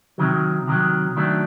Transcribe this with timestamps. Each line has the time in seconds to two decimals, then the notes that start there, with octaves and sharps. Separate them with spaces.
0.18 C3 D#3 F#3
0.67 C3 D#3 F#3
1.16 D#3 F#3 A3 D4